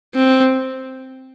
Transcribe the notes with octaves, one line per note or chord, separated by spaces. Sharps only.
C4